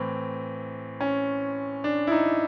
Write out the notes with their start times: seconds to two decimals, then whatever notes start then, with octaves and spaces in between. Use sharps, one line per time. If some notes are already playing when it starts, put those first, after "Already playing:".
Already playing: A2 E3 C4
1.01 C#4
1.84 D4
2.07 E4
2.11 D#4